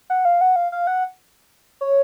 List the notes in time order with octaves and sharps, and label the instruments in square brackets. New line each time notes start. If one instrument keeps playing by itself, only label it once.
[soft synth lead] F#5
F5
F#5
F5
F5
F#5
C#5